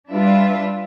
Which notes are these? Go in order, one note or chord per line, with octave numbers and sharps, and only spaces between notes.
G3 D4 F4 B4 E5